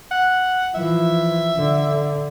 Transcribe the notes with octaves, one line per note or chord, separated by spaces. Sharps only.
F#5
E3 F3 E5
D3